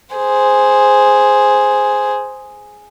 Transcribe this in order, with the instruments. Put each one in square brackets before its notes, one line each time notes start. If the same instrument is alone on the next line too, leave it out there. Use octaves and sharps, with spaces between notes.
[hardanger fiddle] G#4 C5